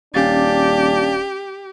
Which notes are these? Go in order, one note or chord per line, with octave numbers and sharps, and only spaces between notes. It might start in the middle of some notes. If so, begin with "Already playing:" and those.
D#1 C#4 D4 G4 F5 A6